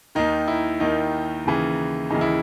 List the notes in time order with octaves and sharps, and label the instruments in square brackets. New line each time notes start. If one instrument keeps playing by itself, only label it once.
[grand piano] D#2 D#3 D#4
E4
D#2 D#3 D#4
D#2 C#3 E3
D#2 C#3 E3 D#4
E4